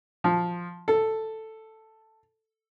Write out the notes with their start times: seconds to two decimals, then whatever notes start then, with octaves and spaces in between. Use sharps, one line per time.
0.24 F3
0.88 A4